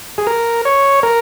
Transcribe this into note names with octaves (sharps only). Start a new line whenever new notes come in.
G#4
A#4
C#5
A#4